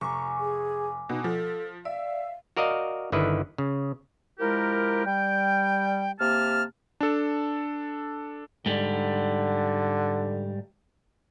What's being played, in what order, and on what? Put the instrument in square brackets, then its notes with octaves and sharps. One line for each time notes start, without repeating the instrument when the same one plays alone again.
[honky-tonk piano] F1 C#6 [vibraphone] G#5 D6 [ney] A#5
[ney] G#4
[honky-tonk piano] B2 [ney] D#4
[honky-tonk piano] F3 [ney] A4
[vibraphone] D5 [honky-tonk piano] E5 [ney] F5
[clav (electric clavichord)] F#4 A#4 D5 D#5 F5
G1 D3 D#3 E4 B4
C#3
[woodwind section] F3 G#3 E4 G4 A#4
G3 G5
C3 A#3 G4 A5 F6
[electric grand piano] D4 A4
[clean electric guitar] G#2 G3 [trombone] D3